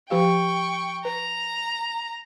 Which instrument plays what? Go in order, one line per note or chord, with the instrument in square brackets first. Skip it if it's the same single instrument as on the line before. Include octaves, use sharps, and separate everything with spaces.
[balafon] F3 G4 F5 [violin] G5 C#6
[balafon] B4 [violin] A#5